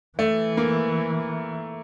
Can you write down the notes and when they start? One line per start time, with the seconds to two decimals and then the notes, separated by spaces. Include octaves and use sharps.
0.18 E3 A3
0.57 A#3